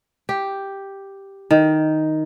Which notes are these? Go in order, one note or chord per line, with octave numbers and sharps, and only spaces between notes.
G4
D#3